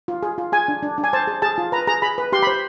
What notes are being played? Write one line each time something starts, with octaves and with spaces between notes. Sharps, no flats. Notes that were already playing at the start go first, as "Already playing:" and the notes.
F4
G#4
F4
G#4 G#5
D4
D4
D4
G#5
C5 A5
G#4
G#4 A5
F4
B4 A#5
G#4 A#5
G#4 B5
B4
G4 C6
B5
C5